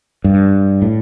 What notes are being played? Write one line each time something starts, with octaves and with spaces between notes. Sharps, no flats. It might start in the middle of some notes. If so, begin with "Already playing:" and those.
G2
A2